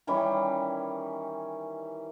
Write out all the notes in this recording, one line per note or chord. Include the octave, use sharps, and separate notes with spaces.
D#3 E3 G3 C#4